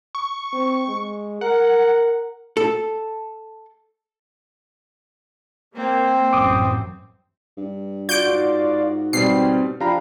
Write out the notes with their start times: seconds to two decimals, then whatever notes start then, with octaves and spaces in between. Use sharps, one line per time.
0.15 C#6
0.53 C4
0.88 G#3
1.41 A#4 F#5
2.57 A4
5.76 A#3 C4
6.33 A1 F#2 E3 D6 D#6
7.57 G2
8.09 F4 F#4 D5 G6 C#7 D7
8.26 G#2 F#4
9.13 B2 G3 C4 C7
9.81 F3 D4 G4 F5 A#5 B5